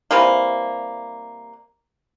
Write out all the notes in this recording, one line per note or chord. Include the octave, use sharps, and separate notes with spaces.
C3 E3 G3 A#3